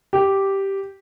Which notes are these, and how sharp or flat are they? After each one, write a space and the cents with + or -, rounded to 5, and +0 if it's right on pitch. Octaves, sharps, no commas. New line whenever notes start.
G4 -5